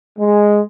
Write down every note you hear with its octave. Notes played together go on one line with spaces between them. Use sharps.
G#3